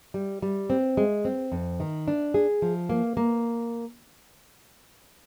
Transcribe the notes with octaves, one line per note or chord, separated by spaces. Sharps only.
G3
G3
C4
G#3
C4
F2
D#3
D4
G#4
F3
A#3
A#3